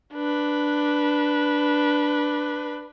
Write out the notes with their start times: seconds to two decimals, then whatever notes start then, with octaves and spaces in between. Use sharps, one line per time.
0.14 D4 B4